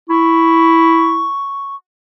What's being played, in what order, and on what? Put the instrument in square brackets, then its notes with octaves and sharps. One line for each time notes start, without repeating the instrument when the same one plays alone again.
[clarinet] E4 [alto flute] C#6